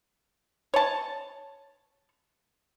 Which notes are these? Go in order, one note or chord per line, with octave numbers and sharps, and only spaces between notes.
C#5 A5